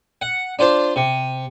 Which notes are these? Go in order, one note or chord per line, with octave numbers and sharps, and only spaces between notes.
F#5
D4 F4 C5 A5
C3